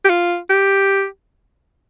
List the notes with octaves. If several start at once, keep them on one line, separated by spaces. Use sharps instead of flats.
G4
F4
G4